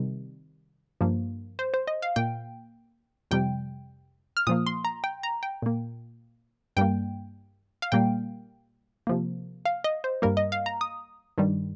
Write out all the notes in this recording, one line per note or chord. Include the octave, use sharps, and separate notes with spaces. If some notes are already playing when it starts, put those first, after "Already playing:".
Already playing: C3 D#3 G3
G2 F3 A#3
C5
C5
D#5
F5
A#2 A#3 G5
F2 C3 G3 G5
F6
A#2 F3 A#3 D#6
C6
A#5
G5
A#5
G5
A#2 A#3
G2 G3 A#3 G5
F5
A#2 G3 A#3 G5
C3 F3 A#3
F5
D#5
C5
G2 G3 A#3 A#4
D#5
F5
A#5
D#6
G2 D#3 G3